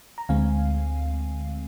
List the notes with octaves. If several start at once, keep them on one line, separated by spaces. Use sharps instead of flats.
A#5
D2 D3 G#3 C4 F5 G#5